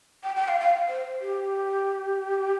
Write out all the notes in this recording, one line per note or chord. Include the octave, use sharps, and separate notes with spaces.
G5
G5
F5
F5
C5
G4